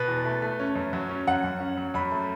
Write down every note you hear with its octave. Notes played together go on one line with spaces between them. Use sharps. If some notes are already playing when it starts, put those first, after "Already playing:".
Already playing: B2 B4
E2
A3
A3
C#4
F#2
F#3
C#4
F#2 F#5
F#2
C#4
F#3
F#2 B5
A3